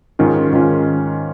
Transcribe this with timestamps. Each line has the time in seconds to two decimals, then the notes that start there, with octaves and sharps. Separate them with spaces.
0.19 G#2 D#3 C#4 F4
0.53 G#2 D#3 C#4 F4